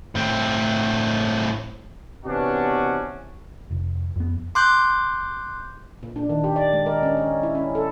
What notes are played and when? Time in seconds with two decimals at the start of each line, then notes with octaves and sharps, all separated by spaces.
0.15 A2 C4
2.26 C3 E3 B3 C#4 D4 F#4
3.71 F1
4.16 F2 B3
4.55 C6 D6 F#6 G6
6.03 A#2
6.16 D4
6.29 D#3
6.44 G4
6.56 D5
6.73 G#3
6.86 A#4
7.03 C#4
7.17 C#4
7.43 E4
7.55 C#4
7.75 A4